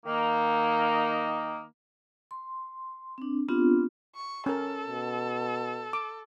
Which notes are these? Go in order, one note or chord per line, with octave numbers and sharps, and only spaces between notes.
D#3 A#3 D#4
C6
C4 D4
B3 C4 D4 F4 G4
C#6
C#4 A4 A#4
B2
D6